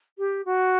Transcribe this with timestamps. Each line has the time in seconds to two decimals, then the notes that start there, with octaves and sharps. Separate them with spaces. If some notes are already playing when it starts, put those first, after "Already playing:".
0.18 G4
0.45 F#4